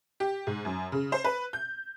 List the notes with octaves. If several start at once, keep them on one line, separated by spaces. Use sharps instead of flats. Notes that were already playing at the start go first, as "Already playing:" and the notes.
G4
G#2
F#2
C#3
C5
B4
G6